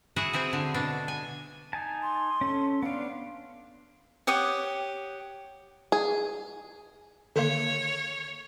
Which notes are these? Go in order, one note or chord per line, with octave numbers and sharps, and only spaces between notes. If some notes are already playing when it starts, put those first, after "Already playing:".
E4 F#4 G#4 F#5
C4 E4 G#4
D3
B2 D4
G#5
D#4 G#5 A5
C6
C#4 A4
B3 D4 F5
G4 C#5 F#5 D#6
G#4
D3 D#3 A#3 C#5